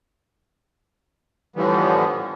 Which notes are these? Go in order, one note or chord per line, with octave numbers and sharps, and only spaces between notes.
A2 D3 E3 F3 G3 B3